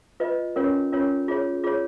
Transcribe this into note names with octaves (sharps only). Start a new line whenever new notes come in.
F4 B4 D#5
C#4 F4 A#4 C#5
C#4 F4 A#4 C#5
F4 G#4 C#5
F4 G#4 C#5